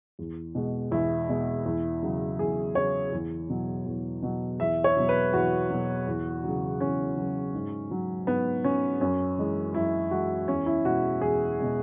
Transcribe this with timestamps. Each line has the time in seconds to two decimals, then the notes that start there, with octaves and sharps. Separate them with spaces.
0.19 E2
0.55 B2 G#3
0.91 E2 E4
1.29 B2 G#3
1.66 E2
2.02 C#3 F#3
2.39 E2 G#4
2.75 C#3 F#3 C#5
3.13 E2
3.50 B2 F#3
3.86 E2
4.22 B2 F#3
4.60 E2 E5
4.84 C#5
4.97 B2 F#3
5.09 B4
5.33 E2 F#4
5.70 B2 F#3
6.07 E2
6.44 C#3 F#3
6.81 E2 C#4
7.17 C#3 F#3
7.54 G#2
7.91 F#3
8.27 G#2 B3
8.64 F#3 C#4
9.01 F#2 C#4
9.38 E3 G#3
9.74 F#2 E4
10.11 E3 G#3 F#4
10.48 E2 C#4
10.66 E4
10.85 B2 G#3 F#4
11.21 E2 G#4
11.59 B2 G#3